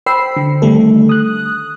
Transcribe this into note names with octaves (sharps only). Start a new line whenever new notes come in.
C5 G5 B5 E6 C7
D3
D3 D#3 G3 A3 A4
D#6 F#6